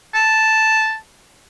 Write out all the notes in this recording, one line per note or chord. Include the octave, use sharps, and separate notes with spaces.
A5